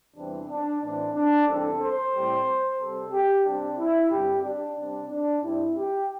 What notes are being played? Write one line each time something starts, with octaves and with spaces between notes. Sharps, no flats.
E2 C3 E3 G3 C4 D4
D4
A2 E3 C4 D4
D4
E2 C3 G3 C4 A4
C5
A2 G3 C4
C3 G3 C4 A4
G4
C3 G3 C4 D4
E4
G2 D3 G3 C4 G4
D4
C3 G3 C4 D4
D4
G2 G3 C4 E4
G4